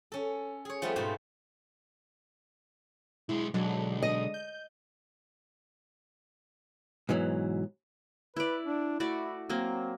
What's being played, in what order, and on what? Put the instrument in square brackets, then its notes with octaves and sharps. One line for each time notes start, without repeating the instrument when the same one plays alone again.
[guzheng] C#4 A4
G#4 C#5
F3 G3 A3 B3 C4 F4
G#2 B2 A3 G4 F5
[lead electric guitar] B1 G#3 [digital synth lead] E4
[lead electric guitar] B1 [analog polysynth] D3 G#3 D4 [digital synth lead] F#3
[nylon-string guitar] D#5 [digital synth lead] D#6
[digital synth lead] G6
[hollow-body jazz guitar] G#2 B2 E3 F#3
[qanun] E4 D5 [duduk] B4
[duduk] D4
[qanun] A3 F#4 D5 [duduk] E4
[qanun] F#3 A#3 [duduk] C4